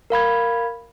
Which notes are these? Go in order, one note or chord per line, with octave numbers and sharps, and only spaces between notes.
A#4 F5 B5 G#6